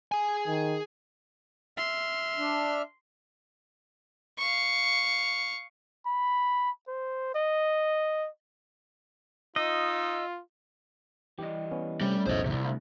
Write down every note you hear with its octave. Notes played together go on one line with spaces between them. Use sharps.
G#4 G#5
D#3
E5 C6 F6
D4
F5 C#6
B5
C5
D#5
D#4 F4 D#5 E6
E3 G3 G4 D#5
B3 C#4
C3 G3 A3 C#4
B1 E2 A2 C5 D#5
C2 C3
D2 F5